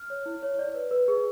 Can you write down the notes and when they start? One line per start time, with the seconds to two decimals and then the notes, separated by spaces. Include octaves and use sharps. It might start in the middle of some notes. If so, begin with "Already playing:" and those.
Already playing: F6
0.10 C#5
0.26 E4
0.42 C#5
0.59 D5
0.74 B4
0.91 B4
1.08 G#4